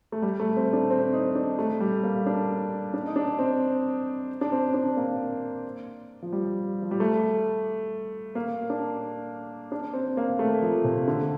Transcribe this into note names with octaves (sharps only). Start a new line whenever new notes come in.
A3
G3
A3
C4
D4
C4
D#4
D4
A3
G3
A#3
D4
D4
D#4
D4
C4
D4
C4
D4
A#3
F3
G3
F3
G3
A3
A#3
D4
D4
C4
A#3
A3
F3
C3
D3